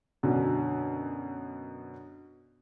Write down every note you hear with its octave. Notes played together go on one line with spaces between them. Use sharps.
F#2 B2 D3